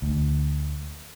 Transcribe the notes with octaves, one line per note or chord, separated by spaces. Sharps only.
D2